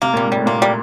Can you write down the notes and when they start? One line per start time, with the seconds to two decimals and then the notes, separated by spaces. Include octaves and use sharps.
0.02 C3 A#3
0.13 A#2 G3
0.25 G#2
0.32 A2 G3
0.46 A#2 A#3
0.62 G3